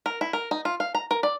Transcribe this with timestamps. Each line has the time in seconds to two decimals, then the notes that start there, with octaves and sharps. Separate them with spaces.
0.06 A#4
0.21 E4
0.33 A#4
0.51 D#4
0.65 F4
0.80 F5
0.95 A#5
1.11 A#4
1.23 D5